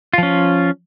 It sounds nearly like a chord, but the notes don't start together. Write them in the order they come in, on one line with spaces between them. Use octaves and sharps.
F4 F3 C#4